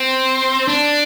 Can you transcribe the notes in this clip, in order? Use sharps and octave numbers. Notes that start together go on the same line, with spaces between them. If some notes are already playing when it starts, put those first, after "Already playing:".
Already playing: C4
D4